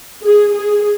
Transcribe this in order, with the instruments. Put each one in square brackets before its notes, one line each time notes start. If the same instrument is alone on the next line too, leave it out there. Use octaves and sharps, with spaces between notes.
[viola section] G#4
G#4